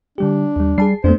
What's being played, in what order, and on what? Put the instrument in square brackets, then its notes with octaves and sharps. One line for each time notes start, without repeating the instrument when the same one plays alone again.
[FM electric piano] D3 G3 G4 [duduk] D4
[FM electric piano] D#2 G3
[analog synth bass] G3 [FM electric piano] G#4 A5 C7
[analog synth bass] F2 [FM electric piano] A3 B3 D4 [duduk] C5